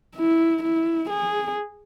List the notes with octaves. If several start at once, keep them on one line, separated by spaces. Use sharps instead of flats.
E4
E4
G#4